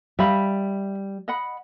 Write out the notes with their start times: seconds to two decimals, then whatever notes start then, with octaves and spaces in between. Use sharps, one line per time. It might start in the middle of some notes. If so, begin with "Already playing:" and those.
0.19 G3 E5 F5 B5
1.28 D#5 F#5 B5